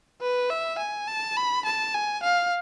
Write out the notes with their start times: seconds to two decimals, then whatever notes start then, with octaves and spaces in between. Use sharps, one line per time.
0.22 B4
0.50 E5
0.79 G#5
1.08 A5
1.37 B5
1.66 A5
1.94 G#5
2.23 F5